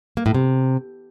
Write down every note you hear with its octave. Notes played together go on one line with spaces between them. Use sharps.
A#3
A2
C3